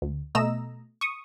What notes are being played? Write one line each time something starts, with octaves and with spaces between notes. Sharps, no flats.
D2
B2 A3 D#5 A#5 E6 E7
C#6 D#6